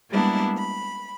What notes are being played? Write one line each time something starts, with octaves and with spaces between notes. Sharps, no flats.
G3 G#3 A#3 B3 D4 E4
B5